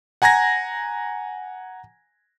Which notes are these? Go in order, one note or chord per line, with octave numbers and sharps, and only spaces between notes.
F#5 G#5 A#5 G#6 A#6